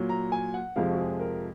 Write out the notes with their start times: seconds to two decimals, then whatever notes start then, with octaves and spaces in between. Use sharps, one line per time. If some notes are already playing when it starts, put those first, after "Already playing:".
Already playing: A#2 F#3
0.09 A#5
0.32 G#5
0.54 F#5
0.76 F2 C3 F3 G#3 F5
0.91 F#4
0.98 G#4
1.20 A#4